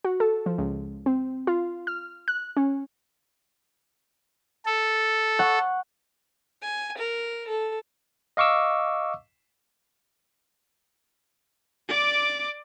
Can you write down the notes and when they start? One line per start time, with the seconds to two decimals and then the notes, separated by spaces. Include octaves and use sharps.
0.05 F#4
0.20 A4
0.46 F3
0.58 C#2
1.06 C4
1.47 F4
1.87 F6
2.28 F#6
2.57 C#4
4.66 A4
5.39 F#5 C#6
6.63 G#5
6.98 A#4
7.48 A4
8.37 D#5 F5 C#6 D6 E6
11.88 D5 D6